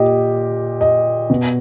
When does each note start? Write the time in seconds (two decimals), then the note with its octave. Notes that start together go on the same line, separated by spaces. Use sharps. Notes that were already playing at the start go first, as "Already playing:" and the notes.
Already playing: A#2 G4 D#5
0.81 D#5
1.30 B2